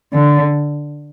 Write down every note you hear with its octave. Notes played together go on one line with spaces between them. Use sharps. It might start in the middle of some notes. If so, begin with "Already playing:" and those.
D3